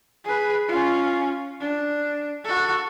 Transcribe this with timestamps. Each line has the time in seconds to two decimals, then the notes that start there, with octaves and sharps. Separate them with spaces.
0.24 G#4 B4
0.68 C#4 F4
1.60 D4
2.44 F#4 A4